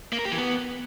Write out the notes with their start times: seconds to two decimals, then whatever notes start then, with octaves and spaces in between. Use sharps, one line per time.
0.12 A#3
0.19 A#4
0.25 G4
0.32 E3
0.38 B3